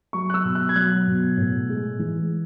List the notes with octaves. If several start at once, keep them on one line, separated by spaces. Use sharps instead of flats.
F#3 C#6
F#6
E6
B2
F#6
G#6
F#3 F#6
B2
A2
G#3
E3